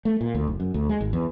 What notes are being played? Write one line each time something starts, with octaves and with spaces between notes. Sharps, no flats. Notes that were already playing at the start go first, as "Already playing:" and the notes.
A3
A#2
D2
F#1
F#2
D2
G#3
G#1
E2